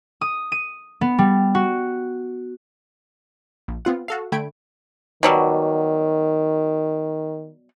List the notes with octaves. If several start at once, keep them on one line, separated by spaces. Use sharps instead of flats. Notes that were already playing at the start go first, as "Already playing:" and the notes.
D#6
D#7
B3
G3
F#4
A#1
B3 C4 F4 F#5
F#4 A4 F5
D3 A3 G5 B5 G#6 D7
B2 D#3 F#3 G3